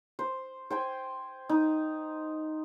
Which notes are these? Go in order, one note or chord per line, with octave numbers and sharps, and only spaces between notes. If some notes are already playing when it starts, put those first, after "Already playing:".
C5
C5 G5 G#5
D#4